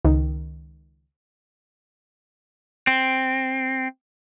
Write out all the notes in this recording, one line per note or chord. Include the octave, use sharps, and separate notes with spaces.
C#2 D#3
C4